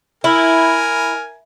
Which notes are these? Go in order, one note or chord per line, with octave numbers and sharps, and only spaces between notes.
E4 A#4 G#5